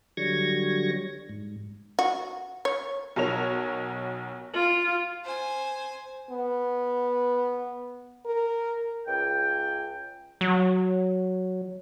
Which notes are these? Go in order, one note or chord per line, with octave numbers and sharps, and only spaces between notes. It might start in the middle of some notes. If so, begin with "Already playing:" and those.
D3 F#3 G3 C#6 G#6 A#6
G#2
F#4
C#5
B1 B2 A#4 C#5 F7
F4
C5 G#5
B3
A#4
C#2 G5
F#3